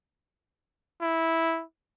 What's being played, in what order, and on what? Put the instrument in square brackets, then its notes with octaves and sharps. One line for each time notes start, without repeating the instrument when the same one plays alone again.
[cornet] E4